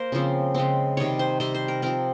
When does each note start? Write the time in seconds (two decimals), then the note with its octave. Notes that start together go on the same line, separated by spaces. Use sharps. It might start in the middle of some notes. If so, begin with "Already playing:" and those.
Already playing: A#3 A#4 C5
0.12 C#3 F3 C4
0.54 C#3 G#3 C4
0.97 C3 D#3 G3 C#5
1.19 C5
1.40 C3 G3 C4 C5
1.54 C5
1.68 A#4
1.82 F3 C4 A#4